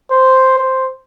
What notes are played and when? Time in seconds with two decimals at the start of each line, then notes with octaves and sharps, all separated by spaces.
0.11 C5
0.58 C5